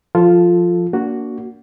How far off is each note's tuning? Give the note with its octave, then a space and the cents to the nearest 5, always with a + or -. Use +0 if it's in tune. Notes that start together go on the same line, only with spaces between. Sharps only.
F3 +5 F4 +0 A4 +0
A#3 +0 D4 -30 F#4 +0